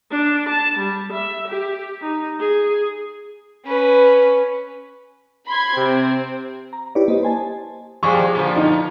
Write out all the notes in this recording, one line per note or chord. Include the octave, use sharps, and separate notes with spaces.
D4
A5
G3
E5
G4
D#4
G#4
C#4 B4
B5 C6 G#6
C3 C4
A#5
E4 G4 B4 C#5 D5
A#3 C5 D#5
C5 G#5 A5
F3 G3 G#3 G#4 C#6
A#2 D3 F3
D#4